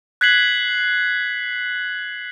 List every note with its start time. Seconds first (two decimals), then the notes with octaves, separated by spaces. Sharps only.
0.21 F#6 G#6 B6 C7 F#7